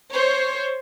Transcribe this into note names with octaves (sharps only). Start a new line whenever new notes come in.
C5 C#5